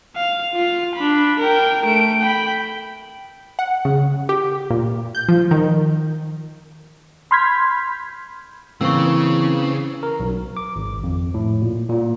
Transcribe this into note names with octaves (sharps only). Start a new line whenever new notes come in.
F5
F4 F5
D4 B5
A#4 G5
A3 D7
G5 B5
F#5
C#3
G4
A#2
G6
F3
D#3
B5 C6 F6 G6 G#6 B6
C#3 E3 A#3 C4 C#6 E6
A#4
B1
D6
G#1
F2
A2
A#2
A#2